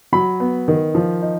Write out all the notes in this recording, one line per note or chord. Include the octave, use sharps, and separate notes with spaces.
F#3 B5
B3
D#3
F3
D#4